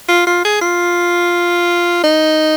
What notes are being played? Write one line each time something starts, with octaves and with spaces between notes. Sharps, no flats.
F4
F4
G#4
F4
D#4